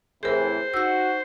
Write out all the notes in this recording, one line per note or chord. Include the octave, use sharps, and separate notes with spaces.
A2 C3 E3 G#4 A#4 C5
D#4 F#4 E6 G6